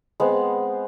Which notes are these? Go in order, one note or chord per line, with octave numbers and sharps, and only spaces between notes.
G#3 B3 C4 F#5